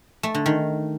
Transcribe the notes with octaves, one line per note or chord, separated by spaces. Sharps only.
A3
D3
D#3